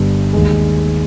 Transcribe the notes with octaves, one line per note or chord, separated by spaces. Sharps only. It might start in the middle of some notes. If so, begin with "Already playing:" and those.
Already playing: G1 G2 G3
D#2 D#3 G#3